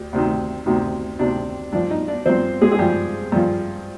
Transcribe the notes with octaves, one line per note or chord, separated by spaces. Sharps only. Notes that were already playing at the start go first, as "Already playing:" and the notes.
Already playing: D2 G4
D2 C3 D#3
D2 C3 D#3
D2 C3 D#3 D4 D5
G2 F3 D4 D5
D#4 D#5
D4 D5
G2 F3 C4 C5
G#3 G#4
G#4
G2 F3 G3 G4
G2 F3